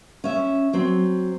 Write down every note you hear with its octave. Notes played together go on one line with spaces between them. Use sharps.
C#4 E5
F#3 C4